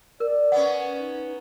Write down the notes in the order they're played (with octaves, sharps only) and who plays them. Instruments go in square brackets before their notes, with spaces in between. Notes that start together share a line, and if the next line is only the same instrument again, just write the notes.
[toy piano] A#4 [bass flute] D5
[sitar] B3 C#4 [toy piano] F#5
[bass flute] D#4